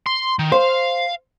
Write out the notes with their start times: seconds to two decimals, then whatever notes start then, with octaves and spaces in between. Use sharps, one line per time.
0.06 C6
0.39 D#3
0.52 C5 F5